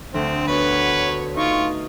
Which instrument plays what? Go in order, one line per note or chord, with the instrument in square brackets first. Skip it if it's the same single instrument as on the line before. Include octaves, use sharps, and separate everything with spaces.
[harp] D2 [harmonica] C4
[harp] B3 F#4 [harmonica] B4 C#5
[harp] D#4 [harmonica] F4 C#6